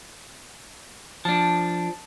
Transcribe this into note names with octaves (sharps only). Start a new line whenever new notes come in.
F3 D4 A5